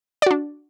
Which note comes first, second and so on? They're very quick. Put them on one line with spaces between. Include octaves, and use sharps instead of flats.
D5 F#4 D4